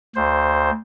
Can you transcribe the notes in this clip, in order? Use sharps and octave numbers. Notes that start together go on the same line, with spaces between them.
D2 C5